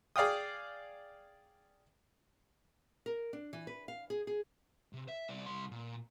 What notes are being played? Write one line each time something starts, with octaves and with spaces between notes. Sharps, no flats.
G#4 D5 F5 G5 D#6
A#4
D4
E3
B4
F5
G#4
G#4
C3
E5
C2 D5
C2 C6
A#2